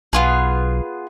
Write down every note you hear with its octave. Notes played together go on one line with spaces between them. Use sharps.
B1 B3 F4 G#4